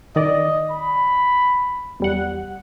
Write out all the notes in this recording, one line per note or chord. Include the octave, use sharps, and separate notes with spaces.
D#3 D5 D#5
B5
E2 G3 F#5